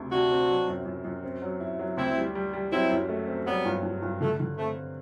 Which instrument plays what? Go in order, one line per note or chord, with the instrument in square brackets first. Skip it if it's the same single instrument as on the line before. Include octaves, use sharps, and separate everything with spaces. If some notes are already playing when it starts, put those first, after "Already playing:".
Already playing: [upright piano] D2 C3
[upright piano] C3 [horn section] D4 F#4
[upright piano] C4
F#3
F#2
F#2
F#2
C4
F#3
E4
F#3
[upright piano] D2 [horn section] C4 E4
[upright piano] G3
G3
G3
[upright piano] F#3 [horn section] C4 E4
[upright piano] F#2
A3
C4
[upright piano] F#3 [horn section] G3 B3
[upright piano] G2
G2
G2
[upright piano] D3 [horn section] A3
[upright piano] D3
[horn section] A3 [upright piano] C4